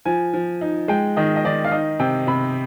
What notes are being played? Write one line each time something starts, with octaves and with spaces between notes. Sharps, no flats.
F3 G#5
F3
D#4
G#3 G5
D#3 D#5
D#5
D#3 D5
F5
D#4 D#5
C3 G5
C3 B5